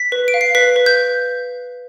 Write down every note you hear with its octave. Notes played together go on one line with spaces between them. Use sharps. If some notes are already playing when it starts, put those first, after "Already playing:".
Already playing: B6
B4
D7
F5
C7
B4 B6
B4
G6